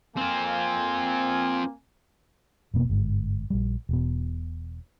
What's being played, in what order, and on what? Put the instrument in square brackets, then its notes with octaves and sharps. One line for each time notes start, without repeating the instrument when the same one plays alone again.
[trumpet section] A#3 G#5 [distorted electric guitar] C4 F4
[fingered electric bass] F1 B2 A#3 B3
G1 G#2
A#1 G3
E1 B2